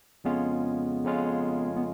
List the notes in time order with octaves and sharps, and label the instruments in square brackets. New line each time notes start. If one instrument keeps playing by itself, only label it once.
[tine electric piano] F2 C#3 G#3 C#4 F4 [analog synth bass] B3
[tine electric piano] F2 C#3 G#3 C#4 F4
[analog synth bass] B3